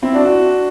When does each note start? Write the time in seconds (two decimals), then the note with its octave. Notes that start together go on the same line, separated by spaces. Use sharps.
0.02 C4 E4
0.14 D4 F#4
0.24 D4 F#4